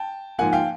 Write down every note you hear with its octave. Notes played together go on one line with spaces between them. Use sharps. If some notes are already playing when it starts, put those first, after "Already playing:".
Already playing: G5 A5
G#2 F3 A#3 F#5 G#5
F5 G5